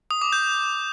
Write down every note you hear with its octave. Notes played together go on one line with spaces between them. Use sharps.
D#6
D6
G6